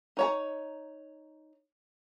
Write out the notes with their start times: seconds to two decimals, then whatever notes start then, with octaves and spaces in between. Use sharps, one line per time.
0.17 D#4 C#5 A#5